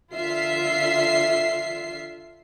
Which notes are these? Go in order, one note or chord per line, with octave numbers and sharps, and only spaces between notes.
D3 F4 E5 C7